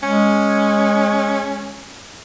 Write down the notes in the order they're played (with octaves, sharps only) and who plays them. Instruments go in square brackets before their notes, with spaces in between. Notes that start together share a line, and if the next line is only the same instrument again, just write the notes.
[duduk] G#3 [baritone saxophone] C#4